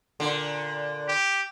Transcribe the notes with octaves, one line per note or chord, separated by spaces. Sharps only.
A#2 D3
G4